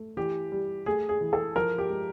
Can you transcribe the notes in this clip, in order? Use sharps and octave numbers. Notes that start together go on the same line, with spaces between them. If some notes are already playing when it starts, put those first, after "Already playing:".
Already playing: A3
E3 G4
G3
A3 G#4
G#4
E3
A4
F3 A#4
G4
G#3